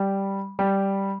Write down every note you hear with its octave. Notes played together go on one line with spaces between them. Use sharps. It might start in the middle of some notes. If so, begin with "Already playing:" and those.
Already playing: G3
G3